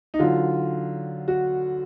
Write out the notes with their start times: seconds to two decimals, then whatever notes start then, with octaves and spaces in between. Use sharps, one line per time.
0.14 D#4
0.19 D3 F#3 F4
1.28 F#4